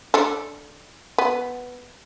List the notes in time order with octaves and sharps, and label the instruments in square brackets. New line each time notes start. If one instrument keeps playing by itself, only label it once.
[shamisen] D4 A4
B3